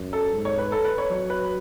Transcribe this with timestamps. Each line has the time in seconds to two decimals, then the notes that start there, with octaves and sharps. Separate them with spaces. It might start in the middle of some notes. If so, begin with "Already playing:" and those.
Already playing: F#2
0.13 A4
0.33 G#2
0.45 C#5
0.58 B4
0.72 A4
0.85 B4
0.98 C#5
1.10 F#3 C#5
1.30 B4